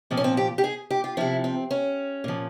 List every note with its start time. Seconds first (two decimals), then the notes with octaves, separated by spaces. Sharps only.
0.11 A#2 F3 C4
0.17 C#4
0.24 C4
0.37 G4
0.58 G4
0.64 G#4
0.90 G4
1.04 F4
1.17 C3 F3 E4
1.44 C4
1.71 C#4
2.24 A#2 F3